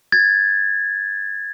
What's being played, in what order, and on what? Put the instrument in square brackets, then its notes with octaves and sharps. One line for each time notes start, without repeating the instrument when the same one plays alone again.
[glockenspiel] G#6 A6